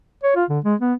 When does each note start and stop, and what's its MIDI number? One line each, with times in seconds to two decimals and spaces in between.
0.23 0.33 73
0.36 0.44 65
0.49 0.59 50
0.64 0.75 56
0.80 0.94 59